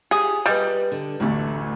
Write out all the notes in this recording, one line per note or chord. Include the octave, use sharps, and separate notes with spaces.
G4 G#4
G3 B4 D5 D#5
D3
A1 D2 D3 A3